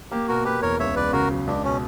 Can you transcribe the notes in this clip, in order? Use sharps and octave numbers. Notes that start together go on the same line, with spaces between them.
A#3 G4
B2 F#4 A#4
A#3 G4 B4
E2 A#4 C#5
C#2 C#5 E5
C#2 B4 D5
C#3 F#4 A#4
F#3
C#2 D4
B2 C#4